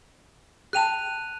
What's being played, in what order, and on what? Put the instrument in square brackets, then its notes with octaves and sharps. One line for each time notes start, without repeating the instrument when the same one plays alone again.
[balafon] G#4 G5 A5 [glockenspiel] F#6 D#7 F7